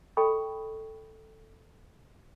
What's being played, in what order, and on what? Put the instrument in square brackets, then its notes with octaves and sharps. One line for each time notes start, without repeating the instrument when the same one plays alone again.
[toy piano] A4 D#5 G5 B5 C#6 D#6